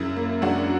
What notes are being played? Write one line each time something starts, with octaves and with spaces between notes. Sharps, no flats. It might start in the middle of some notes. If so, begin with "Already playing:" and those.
Already playing: F#2 C#3 E4
A#3
F#2 D4 F#4